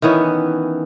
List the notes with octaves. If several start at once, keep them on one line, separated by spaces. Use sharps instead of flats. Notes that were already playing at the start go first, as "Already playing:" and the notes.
D#3 E3 B3 C#4